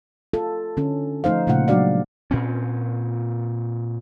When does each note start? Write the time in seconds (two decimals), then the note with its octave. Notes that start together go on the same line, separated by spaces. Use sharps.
0.33 F4 A4
0.77 D3 C#4 A4
1.24 F3 A3 D#4 C5 F5
1.47 A#2 C#3 A3 F4 F#5
1.68 F#3 G#3 D4 F#4 D5 F5
2.31 A#2 C4 C#4